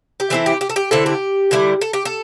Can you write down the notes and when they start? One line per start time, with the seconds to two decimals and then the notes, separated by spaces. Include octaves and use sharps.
0.20 G4
0.30 E3 C4 E4 A4
0.46 G4
0.61 G4
0.69 A4
0.76 G4
0.91 D3 C4 E4 A4
1.06 G4
1.51 D3 G3 E4
1.81 A4
1.93 G4
2.05 A4